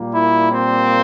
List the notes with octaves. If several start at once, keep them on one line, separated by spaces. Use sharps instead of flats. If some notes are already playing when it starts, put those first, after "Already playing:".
Already playing: A#2 G3 A#3
E4
C4